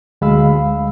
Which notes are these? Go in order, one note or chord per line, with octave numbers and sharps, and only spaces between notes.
D2 G#3 F5 B5 E6